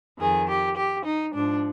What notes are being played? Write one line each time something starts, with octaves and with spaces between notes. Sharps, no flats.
F2 D#3 G#4
G4
G4
D#4
G#2 F3 D4